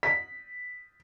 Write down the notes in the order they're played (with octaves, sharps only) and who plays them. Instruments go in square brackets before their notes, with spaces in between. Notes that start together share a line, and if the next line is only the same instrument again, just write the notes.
[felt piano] B6